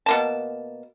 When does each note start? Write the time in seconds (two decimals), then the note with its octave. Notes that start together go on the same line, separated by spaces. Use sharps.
0.06 B2 A#3 A5